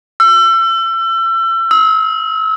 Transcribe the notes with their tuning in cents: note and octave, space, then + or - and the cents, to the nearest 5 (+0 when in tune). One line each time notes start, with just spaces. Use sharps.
E6 +35
E6 -35